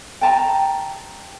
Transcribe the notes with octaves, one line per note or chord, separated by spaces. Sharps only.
G5 A5 A#5